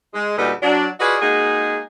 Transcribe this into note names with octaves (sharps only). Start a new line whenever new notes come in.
G#3
D2 A#2 G3 D#4 A4 B4
F#3 D4
F4 F#4 G#4 B4 D5 D#5
G#3 A#3 D#4 F#4 G#4